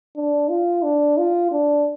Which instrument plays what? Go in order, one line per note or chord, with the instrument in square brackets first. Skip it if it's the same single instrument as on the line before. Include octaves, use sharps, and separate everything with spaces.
[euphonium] D4
F4
D4
F4
D4